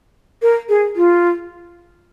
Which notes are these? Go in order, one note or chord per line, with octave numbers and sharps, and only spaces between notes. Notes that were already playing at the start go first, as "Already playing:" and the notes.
A#4
G#4
F4